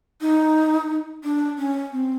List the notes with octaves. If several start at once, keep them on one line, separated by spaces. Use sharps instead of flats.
D#4
D4
C#4
C4